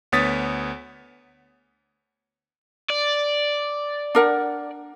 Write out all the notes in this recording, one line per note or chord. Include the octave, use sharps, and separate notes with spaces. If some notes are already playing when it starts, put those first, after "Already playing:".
D2 B3 C#5 D#6 A6 B6
D5
D4 A#4 F#5